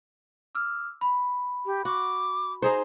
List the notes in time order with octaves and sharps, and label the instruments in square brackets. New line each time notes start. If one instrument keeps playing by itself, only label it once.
[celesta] D6 E6 F6
B5
[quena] G4
[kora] F#4 [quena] D6
[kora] D#4 G#4 C5 [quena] A#5